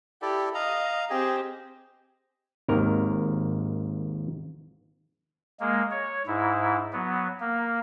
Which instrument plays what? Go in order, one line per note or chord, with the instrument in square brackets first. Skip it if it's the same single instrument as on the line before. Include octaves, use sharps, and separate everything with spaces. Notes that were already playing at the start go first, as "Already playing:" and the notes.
[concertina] E4 A4 D5 [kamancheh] G4
[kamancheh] D#5 [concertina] F5 A#5
[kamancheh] C4 G4 [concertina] G#4 D#5
[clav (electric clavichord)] G#1 D#2 A#4
[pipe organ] G#3 A#3
C#5
G#2 E4
F#3 B3
A#3